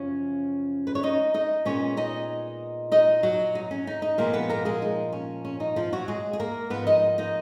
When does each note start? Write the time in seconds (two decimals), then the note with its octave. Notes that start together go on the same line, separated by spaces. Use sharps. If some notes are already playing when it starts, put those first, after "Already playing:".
Already playing: F#2 C#3 F3 C#4 C#5
0.87 B4
0.95 C#5
1.03 D#4 D#5
1.34 D#4 D#5
1.65 A#2 G#3 B3 C#4 C#5
1.97 D#4 D#5
2.92 D#4 D#5
3.23 F#3 F#4
3.55 D#4
3.71 C#4
3.87 D#4
4.02 D#4
4.18 A#2 F3 G#3 A#3 B3 A#4
4.33 B3 B4
4.49 A#3 A#4
4.65 G#3 G#4
4.82 D#4
5.12 C#4
5.45 C#4
5.60 D#4
5.76 F3 F4
5.92 F#3 F#4
6.08 G#3 G#4
6.33 G#4
6.40 A#3 A#4
6.70 G#2 F3 A#3 B3 B4
6.87 D#4 D#5
7.18 D#4 D#5